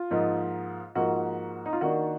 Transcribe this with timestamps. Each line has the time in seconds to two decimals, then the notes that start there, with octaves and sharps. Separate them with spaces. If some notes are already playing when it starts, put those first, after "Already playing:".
Already playing: F4
0.11 G#2 F3 A#3 D#4
0.95 G#2 F3 A#3 F#4
1.66 D#4
1.73 F4
1.81 D#3 A#3 D4 F#4